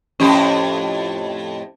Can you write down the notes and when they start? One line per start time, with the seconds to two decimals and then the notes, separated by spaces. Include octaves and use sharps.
0.20 F2 A2 C#4 G4